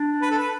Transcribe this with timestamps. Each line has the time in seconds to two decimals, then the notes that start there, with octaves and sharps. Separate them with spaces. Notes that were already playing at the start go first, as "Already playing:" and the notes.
Already playing: D4
0.22 B4
0.30 A4
0.38 B4